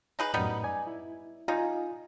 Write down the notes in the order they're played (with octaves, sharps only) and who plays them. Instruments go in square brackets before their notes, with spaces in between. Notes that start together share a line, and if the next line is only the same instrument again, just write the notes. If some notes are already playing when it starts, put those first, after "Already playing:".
[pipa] D#4 G#4 B4
[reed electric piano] F#2 A2 [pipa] G3 B3 D#4
[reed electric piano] D5 G#5
E4
[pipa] G3 D#4 [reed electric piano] F4 G#5